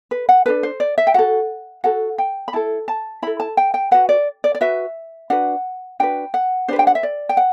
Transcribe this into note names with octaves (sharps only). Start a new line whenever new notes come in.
B4
F#5
D4 F#4 A4 B4
C5
D5
E5
G5
F#4 A4 F#5
F#4 A4 F#5
G5
B5
E4 A4 A5
A5
E4 A4 B5
A5
G5
G5
F#4 B4 F#5
D5
D5
D5
F#4 B4 E5
D4 F#4 B4 F#5
D4 F#4 B4 G5
F#5
D4 G4 B4 C5
G5
F#5
E5
D5
G5
F#5